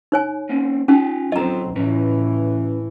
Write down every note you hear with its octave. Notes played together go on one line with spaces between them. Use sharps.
D#4 C#5 G#5
A#3 C4 C#4
C#4 D#4 F4 G5 G#5
F#3 C4 F4 A4 D#5 A#5
A2 C#3 E3 C#4 B4